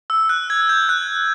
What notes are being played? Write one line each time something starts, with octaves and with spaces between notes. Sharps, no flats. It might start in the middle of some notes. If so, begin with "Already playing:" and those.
E6
F#6
G#6
G6
F#6